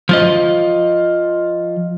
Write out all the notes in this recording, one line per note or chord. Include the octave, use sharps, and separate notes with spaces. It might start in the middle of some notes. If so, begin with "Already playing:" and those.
F3 F4 D#5